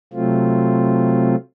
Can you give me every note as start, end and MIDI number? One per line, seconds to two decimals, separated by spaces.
0.13 1.36 48
0.13 1.36 54
0.13 1.36 57
0.13 1.36 60
0.13 1.36 65